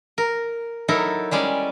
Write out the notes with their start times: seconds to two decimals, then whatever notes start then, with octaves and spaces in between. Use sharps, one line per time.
0.18 A#4
0.88 F#3 D#4 E4 A4 A#4
1.31 G3 G#3 C#4 D5